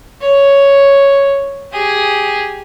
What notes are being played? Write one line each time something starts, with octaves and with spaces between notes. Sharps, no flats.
C#5
G4 G#4